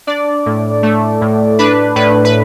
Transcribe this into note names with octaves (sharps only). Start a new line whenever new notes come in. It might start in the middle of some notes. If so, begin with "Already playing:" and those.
D4 D5
A2
A3
A2
D4 B4
A2 B4
B4